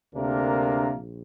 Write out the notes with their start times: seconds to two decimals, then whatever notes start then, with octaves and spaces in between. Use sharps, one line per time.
0.15 D2 C3 A#3 D4 A#4
0.94 A#1